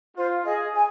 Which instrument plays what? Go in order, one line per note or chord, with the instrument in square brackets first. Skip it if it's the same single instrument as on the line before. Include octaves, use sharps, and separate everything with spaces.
[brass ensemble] F4 [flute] C5
[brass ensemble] G#4 [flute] D#5
[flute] G#5